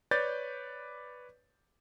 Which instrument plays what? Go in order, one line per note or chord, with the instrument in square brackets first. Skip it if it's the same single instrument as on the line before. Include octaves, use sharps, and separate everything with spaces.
[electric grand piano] B4 C#5 D5 G6 A6